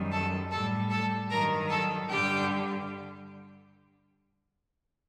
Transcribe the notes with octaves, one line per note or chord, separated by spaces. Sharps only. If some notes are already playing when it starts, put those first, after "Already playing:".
Already playing: F#2 D#3 G3
A4 A5
A2 G3 A4 A5
A4 A5
G2 D#3 F#3 A#4 A#5
A4 A5
G2 D3 G3 G4 G5